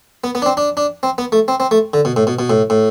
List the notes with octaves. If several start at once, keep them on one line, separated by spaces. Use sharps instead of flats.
B3
B3
D4
C4
D4
D4
C4
B3
A3
C4
C4
A3
D3
B2
A2
B2
B2
A2
A2